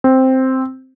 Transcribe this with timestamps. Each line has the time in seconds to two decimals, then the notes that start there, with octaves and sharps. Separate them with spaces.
0.04 C4